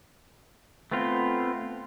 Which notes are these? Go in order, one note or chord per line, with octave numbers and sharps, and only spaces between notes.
A3 B3 C4 F4